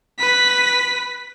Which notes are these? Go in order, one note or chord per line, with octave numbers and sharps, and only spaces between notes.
B4 B6